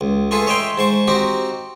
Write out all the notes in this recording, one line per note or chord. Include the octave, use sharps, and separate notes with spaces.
C#2
A3 F4 G#4 A4 B4
C#5 D#5 E5 G5 C6
G#2 C5 C#6
C4 D#4 F#4 G4